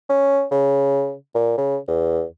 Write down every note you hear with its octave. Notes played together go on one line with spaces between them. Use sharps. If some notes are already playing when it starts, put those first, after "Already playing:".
C#4
C#3
A#2
C#3
E2